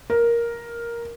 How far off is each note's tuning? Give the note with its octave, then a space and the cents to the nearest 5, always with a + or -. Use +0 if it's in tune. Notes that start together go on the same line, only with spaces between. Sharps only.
A#4 +5